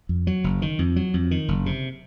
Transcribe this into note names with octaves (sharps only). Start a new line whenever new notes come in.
F2
F#3
F#1
D#3
F2
F#3
F2
D#3
F#1
C3